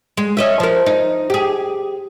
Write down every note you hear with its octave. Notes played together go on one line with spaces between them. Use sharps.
G#3
C#4 D#5 E5
F3 A#4
D#4
G4 G#4